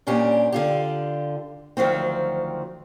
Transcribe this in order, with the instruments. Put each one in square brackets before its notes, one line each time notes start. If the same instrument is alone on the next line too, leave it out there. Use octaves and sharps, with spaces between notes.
[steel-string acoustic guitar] G2 A#2 C#4 D4 G4
D3 F4 G4
D2 D#3 F3 F#3 C4